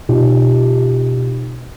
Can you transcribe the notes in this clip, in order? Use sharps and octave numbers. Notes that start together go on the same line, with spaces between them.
B2 D#4 F4 G4